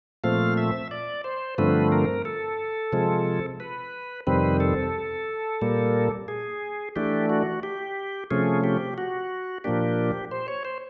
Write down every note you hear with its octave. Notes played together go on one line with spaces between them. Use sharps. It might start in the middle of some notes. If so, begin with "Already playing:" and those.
A#2 F3 A3 C4 F5
E5
D5
C5
G2 D3 F3 A3 C4 B4
A#4
A4
C3 F3 G#3
B4
F2 C3 D#3 G3 C4 B4
A4
A#2 G3 A#3
G#4
E3 A3 D4 G4
F#4
G4
C3 F3 A3 C#4 G#4
G4
F#4
A#2 F3 A#3 D4 G4
C5
C#5
C5